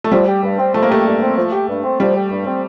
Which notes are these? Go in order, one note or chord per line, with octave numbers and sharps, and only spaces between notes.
A3
F3 G3
G4
G2
C4
F3 A3
A#3
A3 G4
G2
C4
F3
G4
G2
C4
F3 G3
G4
G2
C4